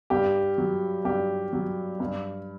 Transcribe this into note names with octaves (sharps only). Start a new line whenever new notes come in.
G2 G4
F#3
G2 G4
F#3
G2